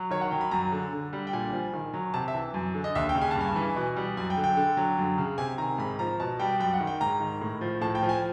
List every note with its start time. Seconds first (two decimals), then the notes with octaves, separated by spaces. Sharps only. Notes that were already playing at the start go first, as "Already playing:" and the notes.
Already playing: F#3
0.11 D#3 C#5
0.21 F#5
0.31 F#3 G5
0.41 B5
0.51 F#2 A#5
0.72 D3
0.93 D3
1.13 G3
1.27 G5
1.33 A#2 G#5
1.53 F3
1.74 D#3
1.94 F#3
2.14 C3 A5
2.28 E5
2.35 E3
2.54 F#2
2.75 D3
2.84 D#5
2.95 D#2 E5
3.09 G5
3.15 C#3
3.22 G#5
3.31 A5
3.35 G2
3.41 G#5
3.56 E3
3.76 B2
3.96 G3
4.17 F#2 G#5
4.30 G5
4.37 D3
4.44 G5
4.57 D3
4.77 F#3
4.98 F#2
5.18 C#3
5.38 C3 G#5
5.58 D#3 A#5
5.78 G#2 B5
5.99 F3 A#5
6.20 B2 A5
6.40 G3 G5
6.60 F#2 G5
6.74 F#5
6.80 D#3
6.87 G5
7.01 G#2 A#5
7.20 D#3
7.41 A2
7.61 F3
7.81 A2 A5
7.95 G5
8.03 F3
8.09 G#5